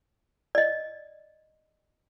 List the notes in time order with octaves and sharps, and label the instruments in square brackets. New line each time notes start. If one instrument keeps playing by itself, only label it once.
[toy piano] D5 D#5